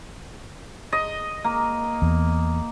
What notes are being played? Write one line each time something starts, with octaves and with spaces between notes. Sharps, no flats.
D#5
A#3
E2